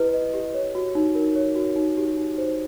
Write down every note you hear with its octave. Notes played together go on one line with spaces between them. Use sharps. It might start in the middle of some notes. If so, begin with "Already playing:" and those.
Already playing: E4 G4 B4 D#5
D#5
G4
C#5
F#4
D#4
A#4
C#5
F#4
D#4
G4
D#4
C5